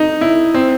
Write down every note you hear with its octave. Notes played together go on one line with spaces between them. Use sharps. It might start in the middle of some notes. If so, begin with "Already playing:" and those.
Already playing: D#4
E4
C4